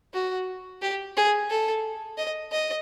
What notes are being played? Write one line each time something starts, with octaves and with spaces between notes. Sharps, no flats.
F#4
G4
G#4
A4
D#5
D#5